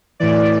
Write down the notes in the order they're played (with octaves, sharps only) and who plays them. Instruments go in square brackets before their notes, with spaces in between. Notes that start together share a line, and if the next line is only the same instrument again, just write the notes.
[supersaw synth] A2 E3 D5